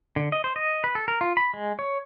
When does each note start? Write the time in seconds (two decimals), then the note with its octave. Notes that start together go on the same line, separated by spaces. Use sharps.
0.16 D3
0.32 D#5
0.44 C5
0.56 D#5
0.84 B4
0.95 A4
1.08 A#4
1.21 F4
1.37 B5
1.54 G#3
1.79 C#5